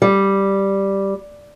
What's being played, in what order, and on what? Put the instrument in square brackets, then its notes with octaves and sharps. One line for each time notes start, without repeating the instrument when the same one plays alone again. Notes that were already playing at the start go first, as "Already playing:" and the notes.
[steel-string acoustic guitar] G3